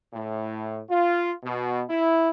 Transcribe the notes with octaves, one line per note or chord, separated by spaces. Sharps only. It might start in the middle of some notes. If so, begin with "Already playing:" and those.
A2
F4
B2
E4